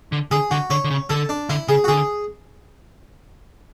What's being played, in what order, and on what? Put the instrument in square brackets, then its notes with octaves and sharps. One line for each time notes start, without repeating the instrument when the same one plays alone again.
[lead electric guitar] D3
[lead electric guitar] D3 [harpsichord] G#4
[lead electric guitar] D3 [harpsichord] F#4
[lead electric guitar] D3 [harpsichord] C#5
[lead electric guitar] D3
C#3
[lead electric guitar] D3 [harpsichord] A4
[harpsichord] D4
[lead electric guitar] D3 [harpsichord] E4
[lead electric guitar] C#3 [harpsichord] G#4
[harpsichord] F#4
[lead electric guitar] D3 [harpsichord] G#4